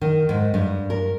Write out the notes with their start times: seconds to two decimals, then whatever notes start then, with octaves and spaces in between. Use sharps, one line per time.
0.01 D#3
0.29 G#2
0.54 G2
0.90 A#4